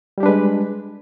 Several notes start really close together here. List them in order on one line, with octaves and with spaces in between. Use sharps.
G3 G4 D4 B4 G#3